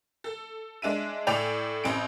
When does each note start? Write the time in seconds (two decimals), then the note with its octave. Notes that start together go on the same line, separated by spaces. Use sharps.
0.24 A4
0.82 G#3 D4 E5 D#7
1.27 A2 A3 D5 G5 G#5 F7
1.84 A1 C4 D7